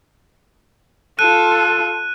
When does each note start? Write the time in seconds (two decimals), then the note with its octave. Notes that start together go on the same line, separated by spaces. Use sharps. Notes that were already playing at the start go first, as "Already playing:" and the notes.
1.19 F4 A4 F#6 D#7